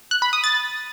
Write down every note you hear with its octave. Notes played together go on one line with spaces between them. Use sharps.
F#6
B5
D#6
A6